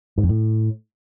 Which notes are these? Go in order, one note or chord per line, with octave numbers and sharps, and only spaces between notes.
G#2
F2
A2